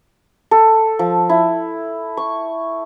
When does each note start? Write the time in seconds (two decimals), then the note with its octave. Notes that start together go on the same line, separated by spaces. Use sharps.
0.51 A4
0.99 F3
1.29 E4
2.17 C#6